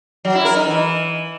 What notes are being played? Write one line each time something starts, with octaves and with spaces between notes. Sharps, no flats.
F#3
E4
A#4
D#4
E3